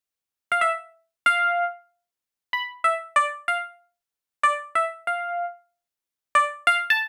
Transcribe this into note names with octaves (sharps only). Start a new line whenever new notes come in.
F5
E5
F5
B5
E5
D5
F5
D5
E5
F5
D5
F5
A5